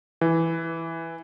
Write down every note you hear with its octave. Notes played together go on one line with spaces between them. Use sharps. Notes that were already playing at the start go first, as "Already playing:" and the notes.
E3